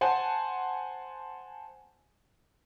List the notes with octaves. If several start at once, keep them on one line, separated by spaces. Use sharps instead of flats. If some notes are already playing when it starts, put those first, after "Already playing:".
C5 F#5 G#5 A5